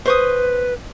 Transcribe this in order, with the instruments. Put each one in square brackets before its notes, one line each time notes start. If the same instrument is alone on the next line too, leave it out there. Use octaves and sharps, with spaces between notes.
[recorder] B4 [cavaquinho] C5 C#6 D#6